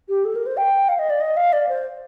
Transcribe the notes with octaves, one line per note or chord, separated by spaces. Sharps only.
G4
A4
A#4
C5
G5
F5
D#5
D5
D#5
F5
D5
C5